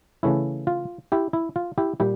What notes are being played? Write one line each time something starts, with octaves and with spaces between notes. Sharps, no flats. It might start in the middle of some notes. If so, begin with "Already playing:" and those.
C#3 E3 A3 C#4 E4
F4
E4 G4
E4
F4
E4 G4
A#2 G3 E4 G4